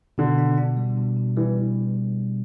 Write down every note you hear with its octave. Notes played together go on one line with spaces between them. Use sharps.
B2 D3
D4
D4
G3
B2
B2
E3 G3